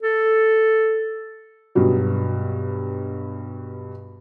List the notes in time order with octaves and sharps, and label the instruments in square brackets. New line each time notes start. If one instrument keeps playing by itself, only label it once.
[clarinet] A4
[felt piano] G2 B2 F#3